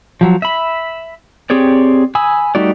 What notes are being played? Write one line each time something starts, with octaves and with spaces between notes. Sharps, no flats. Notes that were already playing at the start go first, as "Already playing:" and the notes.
F3 F#3
E5 B5
C4 G4 G#4 C#5 D5
G#5 B5 D#6 E6
G3 A3 D#4 F#4 D5